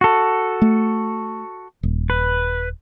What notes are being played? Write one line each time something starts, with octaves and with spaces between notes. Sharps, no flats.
F#4 A4
A3
D#1
B4